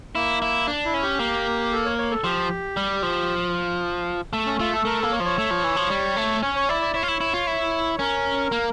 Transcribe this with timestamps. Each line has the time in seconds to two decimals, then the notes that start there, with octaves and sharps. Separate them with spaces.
0.15 A#3 E4
0.42 E4
0.67 D4
0.85 E4
0.94 C#4
1.02 G4
1.19 A#3
1.72 A4
1.85 C#5
1.98 C#5
2.11 A4
2.24 F3 G4
2.77 G3
3.03 F3
4.33 A3
4.46 C#4
4.59 A3 F4
4.72 A4
4.85 A3 A#4
4.99 A#3 A4
5.12 C#5
5.20 F3
5.25 C#5
5.38 A3
5.51 F3
5.64 E3
5.76 F3
5.90 G3
6.16 A3
6.43 C#4 C#5
6.55 C#5
6.69 E4 D5
6.81 D5
6.94 E4 C#5
7.03 F4
7.08 E4
7.21 E4
7.33 F4
7.47 E4
7.99 C#4 A#4
8.52 A#3